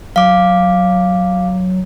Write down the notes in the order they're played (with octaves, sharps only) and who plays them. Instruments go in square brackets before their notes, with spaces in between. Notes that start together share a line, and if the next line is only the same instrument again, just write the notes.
[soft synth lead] F#3 [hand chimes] F5 D6